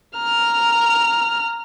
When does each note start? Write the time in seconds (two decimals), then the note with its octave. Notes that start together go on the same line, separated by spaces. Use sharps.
0.18 A#5 F6